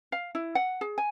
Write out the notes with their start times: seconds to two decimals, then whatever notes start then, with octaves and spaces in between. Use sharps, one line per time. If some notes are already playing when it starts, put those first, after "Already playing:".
0.12 F5
0.35 E4
0.55 F#5
0.81 G#4
0.98 G#5